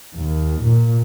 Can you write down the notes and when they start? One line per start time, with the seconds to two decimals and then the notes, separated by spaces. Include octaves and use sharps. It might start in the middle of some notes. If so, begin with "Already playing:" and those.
0.16 D#2
0.65 A#2